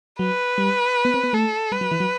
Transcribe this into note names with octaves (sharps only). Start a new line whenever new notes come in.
F#3 B4
G3
B3
C4
B3
A3 A4
G3 B4
F#3
E3
F#3